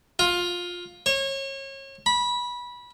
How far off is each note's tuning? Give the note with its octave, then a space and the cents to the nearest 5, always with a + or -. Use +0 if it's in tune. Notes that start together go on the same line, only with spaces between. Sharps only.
F4 +15
C#5 -30
B5 -20